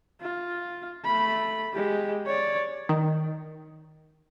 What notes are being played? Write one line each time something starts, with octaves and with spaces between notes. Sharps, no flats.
F4
A3 B5
G#3 G4
C#5 D5
D#3